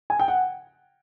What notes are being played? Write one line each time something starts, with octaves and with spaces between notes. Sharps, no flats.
G#5
G5
F#5